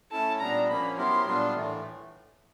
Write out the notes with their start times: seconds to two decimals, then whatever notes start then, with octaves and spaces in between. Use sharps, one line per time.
0.11 A3 C#4 E4 A4 A5
0.40 A#2 G3 B3 D4 A#5
0.68 F3 A#3 C#4 B5
0.97 F#3 B3 E4 G4 A#4 C6
1.26 A#2 G3 B3 D4 F4
1.55 A2 E3 A3